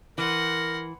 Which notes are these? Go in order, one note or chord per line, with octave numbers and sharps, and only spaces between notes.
E3 A#4 F#5 C6